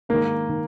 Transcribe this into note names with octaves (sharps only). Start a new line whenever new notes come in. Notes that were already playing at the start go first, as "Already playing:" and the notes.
G#2 D#3 A#3
D#3